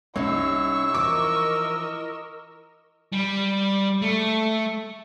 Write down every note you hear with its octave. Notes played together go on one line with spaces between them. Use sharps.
C2 C#4 D#4 C#6 E6
E3 F3 D#4 A#4 D#5 D6
G3
A3